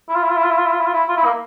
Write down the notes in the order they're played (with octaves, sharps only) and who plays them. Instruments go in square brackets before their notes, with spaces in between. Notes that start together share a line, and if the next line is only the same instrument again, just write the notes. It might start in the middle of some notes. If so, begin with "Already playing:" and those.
[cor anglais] E4
F4
E4
F4
E4
F4
E4
F4
E4
F4
E4
F4
E4
F4
E4
A#3